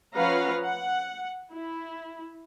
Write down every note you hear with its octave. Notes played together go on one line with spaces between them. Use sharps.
F3 C#4 B4 F5 F#5 A#5
F#5
E4